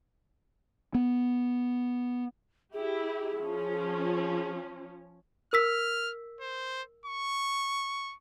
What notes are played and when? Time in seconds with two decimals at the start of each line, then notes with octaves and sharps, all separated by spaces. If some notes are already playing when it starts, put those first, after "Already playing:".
0.95 B3
2.73 E4 G4 G#4
3.40 F3 C#4
5.53 A#4 E6 F6 B6
6.41 C5
7.06 C#6